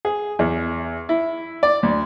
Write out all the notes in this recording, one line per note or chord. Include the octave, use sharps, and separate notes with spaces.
G#4
E2
E4
D5
D2